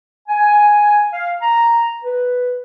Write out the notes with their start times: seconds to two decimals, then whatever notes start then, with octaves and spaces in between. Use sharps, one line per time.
0.28 G#5
1.13 F5
1.41 A#5
2.04 B4